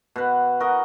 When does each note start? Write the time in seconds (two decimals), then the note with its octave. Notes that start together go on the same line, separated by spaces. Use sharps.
0.16 B2 B4
0.60 F#4 A#4 D#5